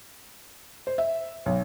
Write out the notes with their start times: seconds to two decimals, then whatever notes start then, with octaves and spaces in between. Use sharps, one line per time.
0.87 C5
0.98 E5
1.46 B1